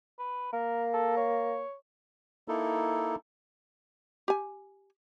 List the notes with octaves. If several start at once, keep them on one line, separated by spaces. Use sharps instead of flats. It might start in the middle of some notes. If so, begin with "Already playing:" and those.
B4
A#3 A#4
A4
C#5
A#3 D#4 E4 A4
G4 G#5